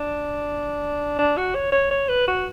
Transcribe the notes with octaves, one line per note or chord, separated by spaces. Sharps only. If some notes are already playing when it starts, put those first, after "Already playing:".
Already playing: D4
D4
F#4
C#5
C#5
C#5
B4
F#4